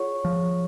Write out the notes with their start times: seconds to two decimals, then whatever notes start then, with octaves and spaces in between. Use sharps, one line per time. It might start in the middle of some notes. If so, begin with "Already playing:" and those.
Already playing: F4 G#4 C#5 F#5 C#6
0.25 F3